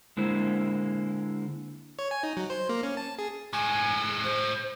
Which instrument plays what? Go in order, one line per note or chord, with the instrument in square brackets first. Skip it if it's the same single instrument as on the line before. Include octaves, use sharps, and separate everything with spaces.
[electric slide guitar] D3 G#3 A#3 E4 C5
[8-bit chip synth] C#5
G#5
D#4
F#3
C5
A#3
C#4
A5
G#4
[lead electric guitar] A2 G#3 [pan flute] G#5
[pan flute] C5